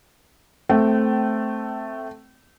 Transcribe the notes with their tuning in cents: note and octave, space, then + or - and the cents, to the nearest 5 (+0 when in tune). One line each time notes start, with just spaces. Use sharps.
A3 +0 C4 +0 G5 -35